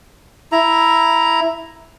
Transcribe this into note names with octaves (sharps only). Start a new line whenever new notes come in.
E4 A#5